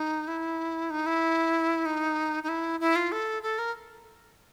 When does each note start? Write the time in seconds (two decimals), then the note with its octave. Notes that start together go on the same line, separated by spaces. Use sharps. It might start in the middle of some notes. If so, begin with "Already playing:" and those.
Already playing: D#4
0.28 E4
0.90 D#4
1.06 E4
1.85 D#4
2.43 D#4
2.48 E4
2.80 E4
2.96 F4
3.12 A4
3.43 A4
3.58 A#4